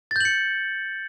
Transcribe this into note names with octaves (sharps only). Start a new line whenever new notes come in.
G6 A6 C#7 F#7